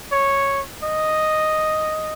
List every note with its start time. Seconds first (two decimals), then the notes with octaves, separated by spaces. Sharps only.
0.12 C#5
0.84 D#5